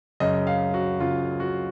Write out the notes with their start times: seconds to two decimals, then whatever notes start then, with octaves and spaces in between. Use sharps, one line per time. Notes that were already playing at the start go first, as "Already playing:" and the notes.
0.20 F#2 C#3 D#5
0.47 F5
0.74 F#4
1.00 F#2 C#3 F4
1.40 F#4